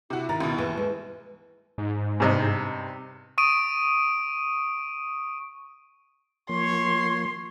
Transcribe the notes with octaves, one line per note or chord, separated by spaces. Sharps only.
C3 E4 F#4
D#3 A#5 A6
C#2 B2
D#2 E3
G#3 A4
G#2
G2 C3 D#4
C#6 D#6 D7 D#7
F3 A#3 C#5 C6